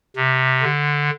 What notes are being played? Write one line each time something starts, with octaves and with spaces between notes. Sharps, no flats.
C3
D3